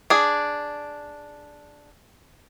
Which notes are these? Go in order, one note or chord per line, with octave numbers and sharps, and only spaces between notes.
D4 G#4